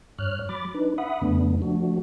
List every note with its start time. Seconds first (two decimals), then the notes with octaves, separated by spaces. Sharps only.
0.19 G2 C#5 F6 F#6
0.49 F#3 B5 D6 A6
0.74 D4 D#4 B4
0.98 E5 F#5 B5 D#6
1.22 F2 C#3 A3 B3 D4
1.62 F3 A3 D4 F#4